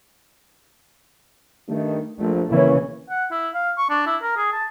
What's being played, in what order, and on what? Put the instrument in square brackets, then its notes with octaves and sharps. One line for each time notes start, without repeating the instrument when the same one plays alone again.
[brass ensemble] G2 D#3 A3
[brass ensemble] A#1 [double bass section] A3
[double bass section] C#3 E3 C#4 [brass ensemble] A#3 E4
[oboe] F#5
E4
F5
C#6
D4
E4
A#4
G#4
A5